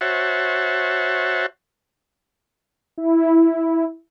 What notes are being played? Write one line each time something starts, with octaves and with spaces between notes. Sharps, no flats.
F#4 C5 C#5 E5 F#5 A5
E4